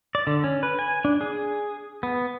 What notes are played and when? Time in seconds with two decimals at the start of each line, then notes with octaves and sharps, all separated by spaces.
0.15 D5
0.27 D3
0.44 C#4
0.63 B4
0.79 G#5
1.05 D4
1.21 G#4
2.03 B3